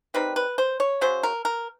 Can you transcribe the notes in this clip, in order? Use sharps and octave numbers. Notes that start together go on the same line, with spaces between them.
D#3 G3 C4 D#4 B4
B4
C5
C#5
C#3 F#3 C5
A#4
A#4